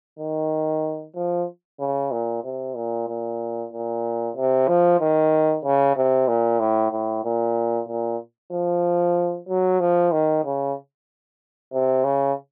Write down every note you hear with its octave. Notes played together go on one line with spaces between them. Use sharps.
D#3
F3
C#3
A#2
C3
A#2
A#2
A#2
C3
F3
D#3
C#3
C3
A#2
A2
A2
A#2
A#2
F3
F#3
F3
D#3
C#3
C3
C#3